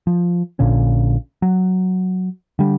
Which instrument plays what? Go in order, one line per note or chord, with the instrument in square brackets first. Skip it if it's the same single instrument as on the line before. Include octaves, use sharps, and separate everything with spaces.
[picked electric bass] F3
A#1 A#2 D3 C#4
F#3
D3 G3